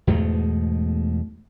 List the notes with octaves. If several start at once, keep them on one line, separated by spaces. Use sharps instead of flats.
E2 G#2 B2 A3